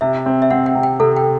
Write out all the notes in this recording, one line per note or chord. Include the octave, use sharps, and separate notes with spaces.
C3 E5
C4
E5
C4 F#5
G5
C3
G5
C3 A4
G5